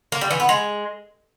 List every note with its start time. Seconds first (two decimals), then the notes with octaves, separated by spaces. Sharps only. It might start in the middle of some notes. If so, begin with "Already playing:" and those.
0.12 A#3
0.21 G3
0.31 E3
0.40 B3
0.49 G#3